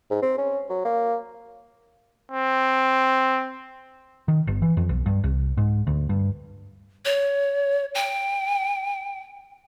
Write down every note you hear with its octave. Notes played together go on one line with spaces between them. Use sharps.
G#2
C4
C#4
F#3
A#3
C4
D#3
G1
E3
F2
B1
G2
C2
G#2
D2
G2
C#5
G5